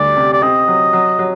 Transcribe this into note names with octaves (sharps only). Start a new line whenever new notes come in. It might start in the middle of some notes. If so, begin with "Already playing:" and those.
Already playing: D2 G3 D5
C3
D5
C4 D#5
F#3
F#3
F#3